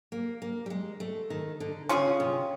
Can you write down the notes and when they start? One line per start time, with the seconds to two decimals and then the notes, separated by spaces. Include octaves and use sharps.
0.12 A#3
0.42 A#3
0.66 G3
0.70 G#3
1.00 A3
1.30 D#3
1.60 D3
1.89 C#3 C#4 F4 G#4
2.20 C3